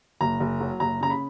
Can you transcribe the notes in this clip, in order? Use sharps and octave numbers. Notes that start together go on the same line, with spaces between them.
F#1 A#5
F#1
F#3
F#1 A#5
C#3 A#5
B5